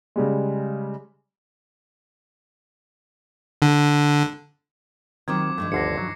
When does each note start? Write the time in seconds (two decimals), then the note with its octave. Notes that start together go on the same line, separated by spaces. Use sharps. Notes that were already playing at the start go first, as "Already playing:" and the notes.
0.16 C#3 G3 G#3
3.62 D3
5.28 D#3 F#3 C4 F4 D6 G#6
5.58 G2 D#3 F3 A3
5.72 G1 D2 D3 A#6 C7 C#7
5.98 F#3